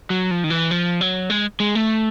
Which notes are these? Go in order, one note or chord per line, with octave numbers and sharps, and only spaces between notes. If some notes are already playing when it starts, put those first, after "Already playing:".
F#3
F3
D#3
E3
F3
F#3
G#3
G#3
A3